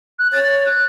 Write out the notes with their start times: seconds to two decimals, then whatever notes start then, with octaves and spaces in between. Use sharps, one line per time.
0.19 F#6
0.33 C#5 A6
0.66 F#6